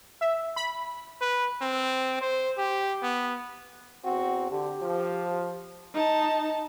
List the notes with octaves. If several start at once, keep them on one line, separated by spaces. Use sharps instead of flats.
E5
B5
B4
C4
C5
G4
B3
E2 C4 F#4
D3 G4
F3
D#4 A5